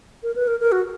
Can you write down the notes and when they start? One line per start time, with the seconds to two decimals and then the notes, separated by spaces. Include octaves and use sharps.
0.23 A#4
0.36 B4
0.47 A#4
0.61 A#4
0.72 F#4